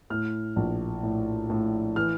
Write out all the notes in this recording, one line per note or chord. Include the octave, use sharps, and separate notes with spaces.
A2 F6
A#1
A2
A2
E3 F6